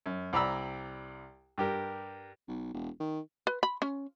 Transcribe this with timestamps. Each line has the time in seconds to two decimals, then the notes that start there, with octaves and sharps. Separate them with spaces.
0.06 F#2
0.33 C2 D5 A#5 B5 E6
1.58 G2 G4 A#4
2.48 B1
2.74 E1
3.00 D#3
3.47 B4
3.63 B5
3.82 C#4